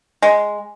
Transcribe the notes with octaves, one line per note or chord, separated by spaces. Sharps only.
G#3